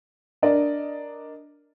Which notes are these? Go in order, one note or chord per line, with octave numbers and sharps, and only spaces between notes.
D4 A#4 D5 D#5